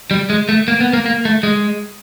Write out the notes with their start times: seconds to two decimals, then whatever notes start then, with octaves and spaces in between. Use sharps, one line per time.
0.11 G3
0.30 G#3
0.49 A3
0.68 A#3
0.81 B3
0.93 A#3
1.06 A#3
1.25 A3
1.43 G#3